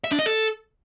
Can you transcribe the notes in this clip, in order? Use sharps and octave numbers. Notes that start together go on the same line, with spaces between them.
E5
D4
D#5
A4